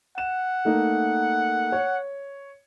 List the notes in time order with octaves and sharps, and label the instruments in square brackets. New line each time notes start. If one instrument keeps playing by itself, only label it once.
[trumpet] F#5 [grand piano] E7
[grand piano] A3 A#3 D#4
C#5